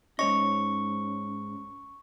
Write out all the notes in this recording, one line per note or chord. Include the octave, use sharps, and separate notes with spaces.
G#2 C#4 C#5 D#5 C#6